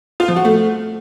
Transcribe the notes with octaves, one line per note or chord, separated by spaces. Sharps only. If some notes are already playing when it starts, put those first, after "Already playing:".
F4
F3
F#4
A3